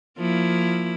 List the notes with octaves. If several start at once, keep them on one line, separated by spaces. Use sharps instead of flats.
F3 A#3 E4